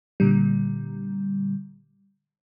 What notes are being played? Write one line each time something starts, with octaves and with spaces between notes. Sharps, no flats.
A#2 D3 G3